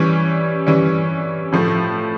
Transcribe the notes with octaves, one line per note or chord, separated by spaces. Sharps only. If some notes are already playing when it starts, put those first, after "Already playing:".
Already playing: E3 G3 C#4
E3 G3 C#4
A2 F3 A3